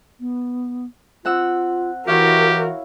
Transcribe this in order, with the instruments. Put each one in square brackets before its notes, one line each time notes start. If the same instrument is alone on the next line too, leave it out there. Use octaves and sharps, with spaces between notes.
[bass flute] B3
[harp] C4 F#5 E6 [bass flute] F4
[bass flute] E3 [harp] E4 C#5 F5 [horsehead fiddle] F#4 A#4 [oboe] G4